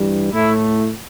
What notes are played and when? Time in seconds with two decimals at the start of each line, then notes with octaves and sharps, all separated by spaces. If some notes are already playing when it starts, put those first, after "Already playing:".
Already playing: G2 E3 G3
0.32 A2 A3 E4